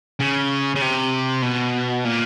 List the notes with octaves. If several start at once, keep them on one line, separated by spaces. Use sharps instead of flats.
C#3
C#3
C3
B2
A#2